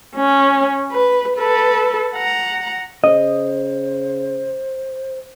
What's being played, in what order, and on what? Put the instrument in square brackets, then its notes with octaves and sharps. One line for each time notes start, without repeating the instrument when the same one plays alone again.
[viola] C#4
B4
A4 B4
F#5 A#5
[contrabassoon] C#3 [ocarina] C5 [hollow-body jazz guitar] D#5